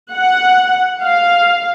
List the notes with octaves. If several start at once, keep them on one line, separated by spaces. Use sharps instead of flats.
F#5
F5